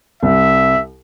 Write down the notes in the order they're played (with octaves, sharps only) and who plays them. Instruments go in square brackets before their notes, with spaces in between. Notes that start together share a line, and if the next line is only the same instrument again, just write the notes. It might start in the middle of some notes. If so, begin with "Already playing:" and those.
[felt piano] C2 [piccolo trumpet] E5